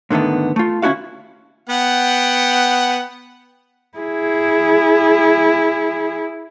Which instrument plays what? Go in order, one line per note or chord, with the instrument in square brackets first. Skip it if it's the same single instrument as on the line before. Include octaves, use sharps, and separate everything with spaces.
[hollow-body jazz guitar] G#2 D3 D#3 A3 B3
A3 F4
D2 C#4 D#4 E4 F#4 F5
[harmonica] B3 F#5 G5
[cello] E4 G#4